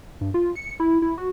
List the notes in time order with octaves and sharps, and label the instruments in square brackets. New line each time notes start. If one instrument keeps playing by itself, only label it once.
[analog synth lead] G2
F4
C#7
E4
E4
F#4